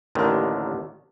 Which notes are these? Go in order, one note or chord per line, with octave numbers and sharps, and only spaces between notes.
A1 D#2 D3 D#3